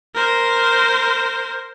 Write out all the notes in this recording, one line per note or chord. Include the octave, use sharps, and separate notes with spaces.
A#4 C5